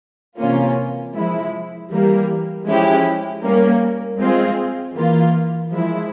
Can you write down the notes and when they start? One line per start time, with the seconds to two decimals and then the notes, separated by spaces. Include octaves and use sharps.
0.39 C3 E3 A#3 C#4 F4
1.15 F3 G#3 E4
1.91 E3 G3 A#3
2.66 F3 G#3 C#4 E4 G4
3.43 G3 A#3 C#4
4.19 G#3 C4 F4 G#4
4.94 E3 A#3 F4
5.71 F3 G#3 E4